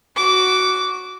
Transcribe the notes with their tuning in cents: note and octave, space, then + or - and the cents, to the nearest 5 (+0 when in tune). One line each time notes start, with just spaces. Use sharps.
F#4 +0 D6 -15